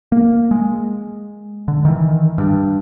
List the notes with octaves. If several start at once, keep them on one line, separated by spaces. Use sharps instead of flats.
A#3
G#3
D3
D#3 E3
G2